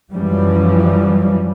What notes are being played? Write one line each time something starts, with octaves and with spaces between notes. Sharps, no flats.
F#2 E3 F3 G3